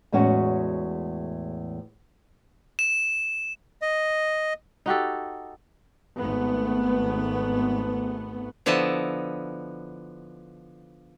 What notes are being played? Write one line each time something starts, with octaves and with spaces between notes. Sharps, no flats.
E2 A2 G#3 C#4 F#4 F#5
E7
D#5
D#4 F#4 G4 A4
G#1 A3 B3
D3 F3 B3 E4 D#5 A5